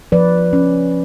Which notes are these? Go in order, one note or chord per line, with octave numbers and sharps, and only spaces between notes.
F3 B4 D5
C#4